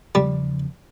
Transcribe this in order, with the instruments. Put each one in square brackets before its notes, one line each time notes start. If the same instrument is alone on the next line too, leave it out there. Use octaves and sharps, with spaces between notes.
[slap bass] E2 C#3 F3 [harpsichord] G3